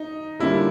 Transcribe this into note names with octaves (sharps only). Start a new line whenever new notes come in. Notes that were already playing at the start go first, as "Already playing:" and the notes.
Already playing: D#4
D3 G3 A#3 C#4 E4 F4